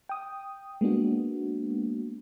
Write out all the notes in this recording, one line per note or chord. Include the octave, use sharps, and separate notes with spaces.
G5 D#6
G#3 A#3 B3 D4 F#4